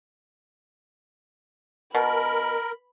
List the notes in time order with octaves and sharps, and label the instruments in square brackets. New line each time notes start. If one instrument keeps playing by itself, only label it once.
[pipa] B2 [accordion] A#4 [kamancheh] B5